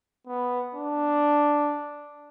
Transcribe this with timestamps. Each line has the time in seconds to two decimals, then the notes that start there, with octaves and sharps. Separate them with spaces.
0.27 B3
0.75 D4